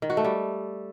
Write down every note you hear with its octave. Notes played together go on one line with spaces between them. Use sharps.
D#3
F#4
A3
G3